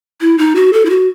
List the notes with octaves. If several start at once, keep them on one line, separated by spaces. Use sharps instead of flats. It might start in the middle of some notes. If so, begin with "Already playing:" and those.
E4
D#4
F#4
A4
E4
F#4